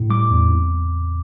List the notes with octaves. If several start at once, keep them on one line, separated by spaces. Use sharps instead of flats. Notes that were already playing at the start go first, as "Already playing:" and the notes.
Already playing: A2
G3 D6
E2
C4